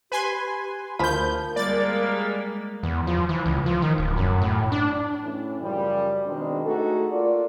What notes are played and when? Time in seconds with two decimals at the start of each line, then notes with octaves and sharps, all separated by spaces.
0.12 G4 B4 G#5 C6
0.99 D2 F3 A#4 B5 G6
1.56 G3 G#3 A#3 D5 A6
2.83 E2
3.07 F3
3.29 E3
3.46 C#2
3.66 F3
3.82 D#3
3.98 D1
4.17 F#2
4.42 A2
4.72 D4
5.22 A2 E3 C#4
5.60 F#2 C#3 F3 G3
6.25 B2 D#3 G#3 C4 D4
6.64 A3 D#4 F#4 G#4 A4
7.12 A#3 F4 A4 D5